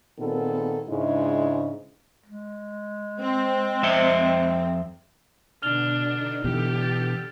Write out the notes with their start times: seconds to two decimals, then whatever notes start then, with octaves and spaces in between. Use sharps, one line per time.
0.18 A#2 D#3 B3 C4 G#4 A4
0.87 G#2 C#3 G#3 D4 E4
2.26 G#3
3.21 C4
3.83 F2 E5 G5
5.62 B2 D3 D4 F6 F7 G7
6.12 D3 D#4
6.44 B2 D3 E3 G4 A4
6.82 G6 A6